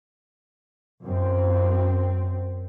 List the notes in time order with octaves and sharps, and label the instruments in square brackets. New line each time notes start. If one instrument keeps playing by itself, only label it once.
[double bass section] F#2 C4